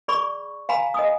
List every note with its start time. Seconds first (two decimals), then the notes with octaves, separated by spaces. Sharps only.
0.08 G#4 D5 B5 C#6
0.69 F5 G#5 A#5 B5
0.94 D#5 G#5 D#6